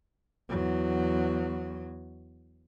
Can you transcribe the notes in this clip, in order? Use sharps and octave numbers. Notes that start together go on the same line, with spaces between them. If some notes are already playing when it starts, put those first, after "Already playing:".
E2 F#3